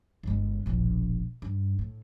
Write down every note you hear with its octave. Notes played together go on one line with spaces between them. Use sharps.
G1 G#3
E1 A#1
G2
A2